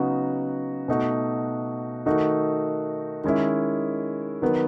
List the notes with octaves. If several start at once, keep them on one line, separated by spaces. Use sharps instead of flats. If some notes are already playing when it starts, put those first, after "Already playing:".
Already playing: C#3 F#3 B3 D#4 F#4
B2 A3 D#4 F#4
D#3 A3 D#4 F#4
D#3 G#3 C#4 E4
D#3 F#3 B3